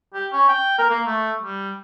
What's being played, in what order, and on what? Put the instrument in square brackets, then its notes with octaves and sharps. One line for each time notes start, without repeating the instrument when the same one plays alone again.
[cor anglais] G4
C#4
G5
A#4
A#3
A3
G3